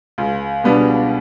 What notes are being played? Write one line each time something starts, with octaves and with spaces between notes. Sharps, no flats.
C#2
B2 G3 B3 D4